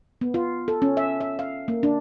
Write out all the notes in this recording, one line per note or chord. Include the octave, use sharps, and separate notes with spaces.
B3
F4
A4
C#4
E5
E5
F5
A#3
D4